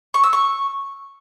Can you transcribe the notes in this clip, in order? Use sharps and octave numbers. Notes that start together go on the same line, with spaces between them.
C#6
E6
C#6